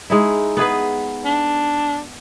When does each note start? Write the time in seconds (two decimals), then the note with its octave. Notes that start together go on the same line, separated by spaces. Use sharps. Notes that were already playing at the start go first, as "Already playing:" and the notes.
0.10 G#3 D#4 E4
0.57 B3 G#4 B4
1.25 D4